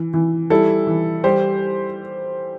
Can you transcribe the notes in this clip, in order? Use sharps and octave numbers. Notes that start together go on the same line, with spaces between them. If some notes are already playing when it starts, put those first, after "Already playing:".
Already playing: E3
E3
G3 E4 A4
E3
G3 G4 C5